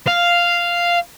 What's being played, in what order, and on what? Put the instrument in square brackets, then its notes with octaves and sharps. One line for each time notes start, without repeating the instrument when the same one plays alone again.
[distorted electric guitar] F5